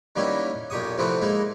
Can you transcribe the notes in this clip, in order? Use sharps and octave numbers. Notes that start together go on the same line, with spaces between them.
D#3 G3 A#3 B3 C#4 E4
B1 A#2 G4 C#6 D#6
C3 E3 F3 A3 B3 C4
G#3 A#3 D#4 E4